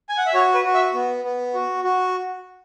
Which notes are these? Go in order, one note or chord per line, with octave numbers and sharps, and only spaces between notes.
G#5
F#5
E5
F#4 C#5
B4
F#4
E5
B3
B3
F#4
F#4